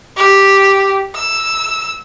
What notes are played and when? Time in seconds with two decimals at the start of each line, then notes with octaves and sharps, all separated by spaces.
0.17 G4
1.15 E6